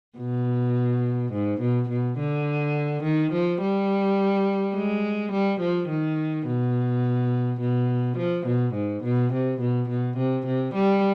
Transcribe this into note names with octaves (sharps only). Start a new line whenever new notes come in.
B2
G#2
B2
B2
D3
D#3
F3
G3
G#3
G3
F3
D#3
B2
B2
F3
B2
G#2
B2
C3
B2
B2
C3
C3
G3